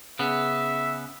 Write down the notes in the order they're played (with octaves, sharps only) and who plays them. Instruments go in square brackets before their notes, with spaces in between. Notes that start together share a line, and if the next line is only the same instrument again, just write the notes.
[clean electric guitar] C#3 B3 [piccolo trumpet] E5